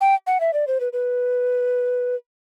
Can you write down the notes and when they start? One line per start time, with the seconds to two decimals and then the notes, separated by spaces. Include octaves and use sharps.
0.01 G5
0.27 F#5
0.40 E5
0.53 D5
0.67 C5
0.80 B4
0.93 B4